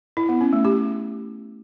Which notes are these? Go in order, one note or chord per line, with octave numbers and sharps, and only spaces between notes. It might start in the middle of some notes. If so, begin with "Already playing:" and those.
E4
B3
C#4
A3
G4